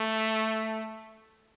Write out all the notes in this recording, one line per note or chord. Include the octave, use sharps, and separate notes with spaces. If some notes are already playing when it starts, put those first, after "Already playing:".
Already playing: A3